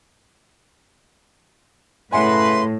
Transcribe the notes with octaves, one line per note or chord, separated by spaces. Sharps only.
A2 C#3 B4 E5 F#5 G#5 C6